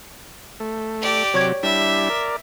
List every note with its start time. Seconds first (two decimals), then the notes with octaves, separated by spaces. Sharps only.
0.60 A3
1.02 G4 D5
1.34 C3 F#3 C#5 C#6 G#6
1.63 G3 D4 E4 E5
2.10 A#4 D5